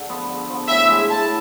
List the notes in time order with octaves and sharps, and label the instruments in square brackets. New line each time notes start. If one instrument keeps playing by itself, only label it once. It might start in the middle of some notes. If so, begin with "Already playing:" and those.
Already playing: [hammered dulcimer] D3
F3 B3
D3
F3 B3
[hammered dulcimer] A2 [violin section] E5
[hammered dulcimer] G#3 B3 E4
[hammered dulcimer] A2 [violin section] A5